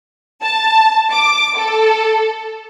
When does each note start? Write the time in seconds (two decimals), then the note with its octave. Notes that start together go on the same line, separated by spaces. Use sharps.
0.43 A5
1.13 D6
1.58 A4